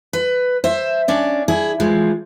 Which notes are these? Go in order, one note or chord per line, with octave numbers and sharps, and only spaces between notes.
B4
C5 E5
C#4 D4 D5
E4 G#4
E3 F3 G#3